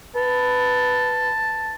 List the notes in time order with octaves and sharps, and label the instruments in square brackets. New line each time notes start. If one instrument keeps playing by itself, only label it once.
[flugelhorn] B4 [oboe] A5